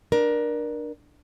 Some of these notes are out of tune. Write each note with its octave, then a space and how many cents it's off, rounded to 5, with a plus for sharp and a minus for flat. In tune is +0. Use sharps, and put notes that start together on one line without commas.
D4 +20 A#4 +20